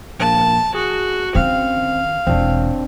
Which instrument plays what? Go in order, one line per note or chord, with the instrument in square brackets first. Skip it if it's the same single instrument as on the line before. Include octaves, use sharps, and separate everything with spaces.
[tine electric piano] A#1 A#3 [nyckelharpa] A5
[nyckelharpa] F#4 [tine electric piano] G#4
[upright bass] D#3 C#4 [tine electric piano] C4 [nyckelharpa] F5
[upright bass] E1 [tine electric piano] C4 D4